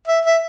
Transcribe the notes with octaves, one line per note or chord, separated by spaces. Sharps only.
E5
E5